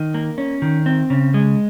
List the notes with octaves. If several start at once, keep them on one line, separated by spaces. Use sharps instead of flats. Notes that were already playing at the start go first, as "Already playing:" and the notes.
Already playing: D#3
A#3
C#4
D#3
C4
C#3
G#3